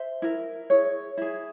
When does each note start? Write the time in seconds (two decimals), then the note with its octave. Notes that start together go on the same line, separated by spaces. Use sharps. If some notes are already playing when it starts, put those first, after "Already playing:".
Already playing: C5 E5
0.22 E4 A#4
0.70 E4 G#4 C#5
1.17 E4 G#4